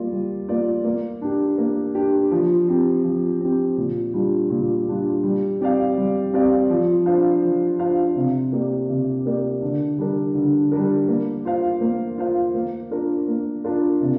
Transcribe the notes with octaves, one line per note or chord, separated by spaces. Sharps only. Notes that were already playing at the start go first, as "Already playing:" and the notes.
Already playing: G3 A#3 F4 D5
G3
A#3 F4 D5
A#3
D4 G4
A#3
D4 G4
F3
C4 G4
F3
C4 G4
A#2
G3 D4 F4
A#2
G3 D4 F4
G3
C4 G4 D5 F5
G3
C4 G4 D5 F5
F3
D4 F4 C5 F5
F3
D4 F4 C5 F5
C3
A#3 G4 A#4 D5
C3
A#3 G4 A#4 D5
D3
G3 D4 A#4
D3
G3 D4 A#4
A#3
F4 C5 F5
A#3
F4 C5 F5
A#3
D4 F4 A#4
A#3
D4 F4 A#4
C3